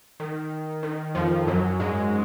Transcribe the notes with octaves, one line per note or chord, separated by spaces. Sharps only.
D#3
D#3
F2 F3
F#2 F#3
G#2 G#3